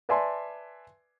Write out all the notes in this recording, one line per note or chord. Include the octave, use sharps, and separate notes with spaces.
B4 D5 E5 G#5 A5 C6